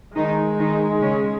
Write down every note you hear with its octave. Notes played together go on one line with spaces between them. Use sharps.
D#3 G#3 D#4
D#3 D#4
C#3 C#4